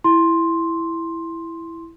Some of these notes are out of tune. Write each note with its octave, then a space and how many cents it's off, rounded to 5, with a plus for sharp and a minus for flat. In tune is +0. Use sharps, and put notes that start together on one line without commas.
E4 +5 C6 +5